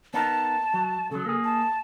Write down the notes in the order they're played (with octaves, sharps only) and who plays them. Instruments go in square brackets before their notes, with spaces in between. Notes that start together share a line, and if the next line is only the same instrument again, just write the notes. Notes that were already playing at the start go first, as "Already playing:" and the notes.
[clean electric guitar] B3 D#4 A#4 [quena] A5
[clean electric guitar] F#3
[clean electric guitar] C#3 F#3 [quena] A4
[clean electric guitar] A#3 G#4
[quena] A5